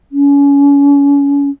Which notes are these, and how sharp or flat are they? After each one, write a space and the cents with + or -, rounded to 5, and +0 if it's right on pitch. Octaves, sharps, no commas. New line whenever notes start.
C#4 +30